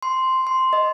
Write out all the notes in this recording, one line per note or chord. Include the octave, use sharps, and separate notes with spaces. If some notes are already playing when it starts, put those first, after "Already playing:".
C6
C6
D#5